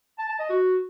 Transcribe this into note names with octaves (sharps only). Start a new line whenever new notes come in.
A5
A5
D#5
F#4